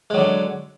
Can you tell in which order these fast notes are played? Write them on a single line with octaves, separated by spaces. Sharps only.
G#3 F#3 D3